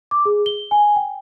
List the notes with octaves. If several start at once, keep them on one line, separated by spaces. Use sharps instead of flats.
D6
G#4
G7
G#5
G5